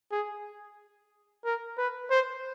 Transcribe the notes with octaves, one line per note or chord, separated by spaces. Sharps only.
G#4
A#4
B4
C5